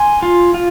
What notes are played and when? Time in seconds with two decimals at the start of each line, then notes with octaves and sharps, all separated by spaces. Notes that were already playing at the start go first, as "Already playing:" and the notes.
Already playing: G#5 C6
0.23 F4
0.54 F4